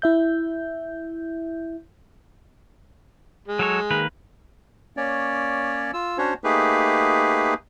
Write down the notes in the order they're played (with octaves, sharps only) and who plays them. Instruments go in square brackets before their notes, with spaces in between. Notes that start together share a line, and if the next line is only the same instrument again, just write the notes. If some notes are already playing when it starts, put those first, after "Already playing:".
[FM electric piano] E4 E5 G6
[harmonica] G#3
[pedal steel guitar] F#3 A4 C#5
D#3 A#3 B4
[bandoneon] A#3 C#4 C#5 D5
F4 E6
C#4 D4 F#4 C5 C#5
A3 A#3 D#4 G4 G#4 B4